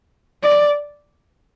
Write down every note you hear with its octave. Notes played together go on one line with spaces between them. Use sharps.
D5